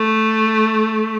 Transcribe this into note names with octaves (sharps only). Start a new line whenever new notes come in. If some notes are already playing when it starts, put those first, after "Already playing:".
Already playing: A3